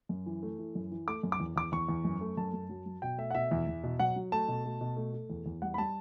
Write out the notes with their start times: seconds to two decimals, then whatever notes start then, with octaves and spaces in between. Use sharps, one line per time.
0.09 F#2
0.26 E3
0.43 A3
0.59 E3
0.75 F#2
0.91 E3
1.07 A3 D6
1.23 F#2
1.32 D6
1.40 E2
1.56 E2 D6
1.72 E2 C#6
1.88 E2
2.05 F#2
2.21 A3
2.37 F#2 A5
2.54 F#2
2.69 F#3
2.86 F#3
3.02 B2 G5
3.18 A3 E5
3.31 F#5
3.34 B2 E5
3.51 E2
3.67 E2
3.83 B2
3.99 F#3 F#5
4.16 F#3
4.32 A3 A5
4.48 B2
4.65 A3
4.81 B2
4.97 A3
5.13 A3
5.30 E2
5.46 E2
5.62 G3 F#5
5.74 B5
5.78 G3 A5